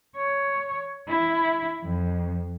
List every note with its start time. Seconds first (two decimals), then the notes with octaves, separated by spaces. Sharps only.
0.16 C#5
1.09 E4
1.83 F2